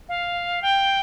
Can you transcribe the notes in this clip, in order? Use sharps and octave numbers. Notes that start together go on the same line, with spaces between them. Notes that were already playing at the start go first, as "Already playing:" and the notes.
F5
G5